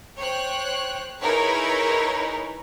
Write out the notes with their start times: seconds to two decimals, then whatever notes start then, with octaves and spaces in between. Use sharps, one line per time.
0.18 C5 C#5 G5 F#6
1.20 D#4 E4 G#4 A#4 B4 C#5